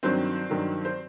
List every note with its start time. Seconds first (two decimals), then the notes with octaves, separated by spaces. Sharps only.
0.03 G2 D#3 F#3 C4 C5
0.50 G2 D#3 F#3
0.85 C5